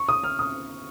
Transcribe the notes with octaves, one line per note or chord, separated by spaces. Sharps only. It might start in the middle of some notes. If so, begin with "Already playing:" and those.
Already playing: C#6
D#6
F6
D#6